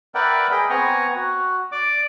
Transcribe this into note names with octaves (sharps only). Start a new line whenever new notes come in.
A#4 B4 D5 E5 F#5 G5
G#4 D#5 G5 B5
B3 C4 G#5 A#5 C#6
F#4
D5 D6